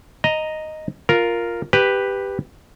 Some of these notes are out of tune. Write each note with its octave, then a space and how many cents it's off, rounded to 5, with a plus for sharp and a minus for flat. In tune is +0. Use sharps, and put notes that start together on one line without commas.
D#5 +0 A#5 +0
F4 +0 A#4 +0
G4 +10 B4 +0